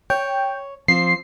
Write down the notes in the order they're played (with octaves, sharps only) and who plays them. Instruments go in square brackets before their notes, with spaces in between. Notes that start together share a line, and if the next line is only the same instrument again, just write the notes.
[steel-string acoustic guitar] C#5 [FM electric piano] G5
[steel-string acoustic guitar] F3 C4 [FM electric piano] C7